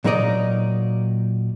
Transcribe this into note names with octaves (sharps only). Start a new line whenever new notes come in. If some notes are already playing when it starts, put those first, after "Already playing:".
A#2 F#3 D#4 A#4 D5 D#5